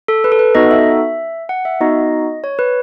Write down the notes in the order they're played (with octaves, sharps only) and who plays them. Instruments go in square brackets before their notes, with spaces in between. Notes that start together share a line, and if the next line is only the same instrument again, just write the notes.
[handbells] A4
B4
A4
B4
B3 D#4 F#4 A4 D#5
E5
F#5
E5
B3 D#4 F#4 D#5
C#5
B4